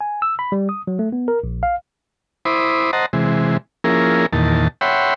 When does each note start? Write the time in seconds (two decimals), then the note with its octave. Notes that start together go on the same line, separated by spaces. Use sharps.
0.01 G#5
0.22 E6
0.39 B5
0.52 G3
0.69 D#6
0.87 F#3
0.99 A3
1.13 B3
1.28 A#4
1.44 A#1
1.63 F5
2.45 E4 C5 B5 D6 D#6
2.93 C5 D#5 F#5 A5 A#5
3.13 C3 E3 G#3
3.84 F3 A#3 C#4 E4 G#4 A#4
4.33 E2 A#2 D#3 A5
4.81 C#5 E5 F#5 G5 B5 C6